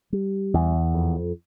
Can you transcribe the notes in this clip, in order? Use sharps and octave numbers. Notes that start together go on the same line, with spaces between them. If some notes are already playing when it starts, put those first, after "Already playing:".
G3
E2
F2